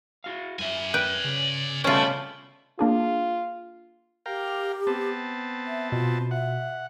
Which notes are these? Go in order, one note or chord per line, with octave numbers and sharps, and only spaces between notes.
E4 F#4 F5
F#2 E4 D5 E5 G#5
B4 G5
C#3
B2 G3 A3 C#4 E4 F4
A#3 D4 F4 G#4
G4 A#4 F5 G5
B3 C4 A5
E5
B2 F4
E5 F#5